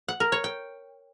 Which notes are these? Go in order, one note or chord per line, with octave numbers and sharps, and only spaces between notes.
F#5
A#4
C#5
G5